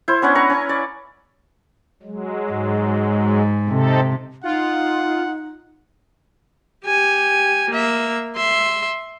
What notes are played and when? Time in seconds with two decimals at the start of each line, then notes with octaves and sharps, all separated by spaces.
0.08 E4 C5
0.22 B3 C#4 D4 F#5
0.35 B4 A#5 C#6
0.50 C#4
0.69 D5
2.03 F#3 G#3
2.52 G#2
3.70 C3 C4 D#4 A4
4.44 D#4 F4 F#5
6.85 G4 G#5
7.70 A#3 E5
8.36 E5 C6